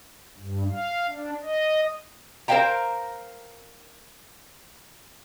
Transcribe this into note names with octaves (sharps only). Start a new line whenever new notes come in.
G2
F5
D4
D#5
A#4 C5 D#5 F5 G5 A#5